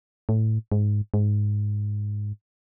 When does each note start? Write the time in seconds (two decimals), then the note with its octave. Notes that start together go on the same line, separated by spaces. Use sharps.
0.29 A2
0.72 G#2
1.14 G#2